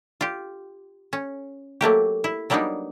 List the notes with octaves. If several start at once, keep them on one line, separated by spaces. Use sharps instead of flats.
F4 G4
C#4
F#3 A3 A#3 G4
E4
F#3 G3 A#3 B3 D4 D#4